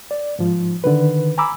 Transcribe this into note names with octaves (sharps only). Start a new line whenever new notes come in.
D5
G#2 F3
D3 D#3 B4
G#5 A#5 B5 D6 E6